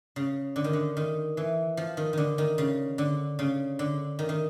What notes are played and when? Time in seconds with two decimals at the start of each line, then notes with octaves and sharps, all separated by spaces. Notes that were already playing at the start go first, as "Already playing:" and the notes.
0.16 C#3
0.56 D3
0.64 D#3
0.73 D3
0.97 D#3
1.37 E3
1.77 F3
1.97 D#3
2.13 D3 D#3
2.38 D#3
2.58 C#3
2.98 D3
3.39 C#3
3.79 D3
4.19 D#3
4.29 D#3